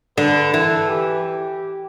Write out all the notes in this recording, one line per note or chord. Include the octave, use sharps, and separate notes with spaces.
D3 B4
E3 A4
G4